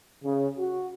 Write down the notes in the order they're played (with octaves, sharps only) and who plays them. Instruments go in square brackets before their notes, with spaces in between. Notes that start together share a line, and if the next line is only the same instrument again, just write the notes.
[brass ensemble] C#3
F#4